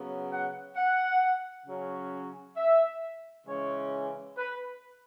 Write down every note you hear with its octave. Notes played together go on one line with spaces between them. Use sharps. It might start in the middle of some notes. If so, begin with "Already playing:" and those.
Already playing: C#3 F#3 B3
F#5
F#5
C#3 F#3 C#4
E5
C#3 E3 G#3 C#4 C#5
B4